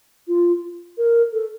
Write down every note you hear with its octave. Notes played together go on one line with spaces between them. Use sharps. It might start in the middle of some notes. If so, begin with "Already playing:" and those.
F4
A#4
A4